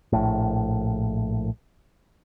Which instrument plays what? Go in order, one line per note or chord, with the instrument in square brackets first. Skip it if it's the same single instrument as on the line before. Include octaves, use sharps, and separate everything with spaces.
[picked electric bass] A#1 A2